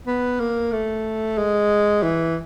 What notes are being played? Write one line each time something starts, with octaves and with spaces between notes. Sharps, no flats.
B3
A#3
A3
G#3
E3